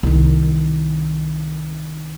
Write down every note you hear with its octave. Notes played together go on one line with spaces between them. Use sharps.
C2 D#3